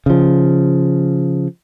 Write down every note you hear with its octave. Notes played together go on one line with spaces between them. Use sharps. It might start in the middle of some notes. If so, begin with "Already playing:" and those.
C#3 F3